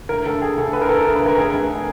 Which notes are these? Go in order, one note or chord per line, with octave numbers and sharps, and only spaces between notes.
D2 A#4
D2 A4
D2 G#4
D2 A4
D2 B4
A#4
D3 A4
A#4
D3
B4
D2 A#4
F1 G#4
F1